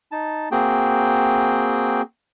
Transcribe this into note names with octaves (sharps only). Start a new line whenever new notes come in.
D#4 A5
A#3 C4 F#4 G#4 G5